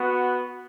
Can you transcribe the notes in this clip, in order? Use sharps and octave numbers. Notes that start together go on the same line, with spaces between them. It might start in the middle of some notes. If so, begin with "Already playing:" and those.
Already playing: B3 F#4